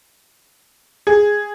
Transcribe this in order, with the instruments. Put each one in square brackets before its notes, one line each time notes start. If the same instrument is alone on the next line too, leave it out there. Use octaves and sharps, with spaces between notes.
[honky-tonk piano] G#4